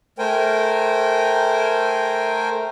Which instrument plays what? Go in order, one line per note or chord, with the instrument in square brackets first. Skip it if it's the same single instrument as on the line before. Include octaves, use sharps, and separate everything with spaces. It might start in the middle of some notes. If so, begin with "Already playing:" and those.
[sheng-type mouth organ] A3 A#4 C5 G5 G#5